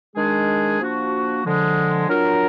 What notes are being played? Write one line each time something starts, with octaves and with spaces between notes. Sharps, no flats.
D#3 G#3 D4 G#4
F3 A#3 D4 F#4
D3 F3 G#3
F#3 D4 F4 A#4